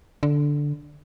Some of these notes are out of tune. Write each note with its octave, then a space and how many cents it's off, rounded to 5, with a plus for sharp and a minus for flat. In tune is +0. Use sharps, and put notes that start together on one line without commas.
D3 -5